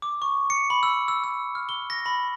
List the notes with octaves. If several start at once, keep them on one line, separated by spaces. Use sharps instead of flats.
D6
C#6
C#7
B5
E6
E6
E6
F6
G7
A#6
B5